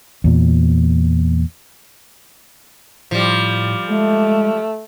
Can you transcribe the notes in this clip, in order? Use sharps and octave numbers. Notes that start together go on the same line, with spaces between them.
E2 A#2
A2 F3 G3
G#3 A3